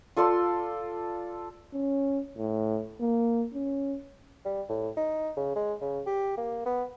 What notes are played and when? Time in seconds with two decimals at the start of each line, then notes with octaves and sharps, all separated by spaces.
0.16 F4 A4 D5 C6
1.73 C#4
2.37 A2
3.00 A#3
3.54 C#4
4.46 G3
4.69 A2
4.97 D#4
5.37 C#3
5.56 G#3
5.81 C#3
6.06 G4
6.37 A#3
6.66 B3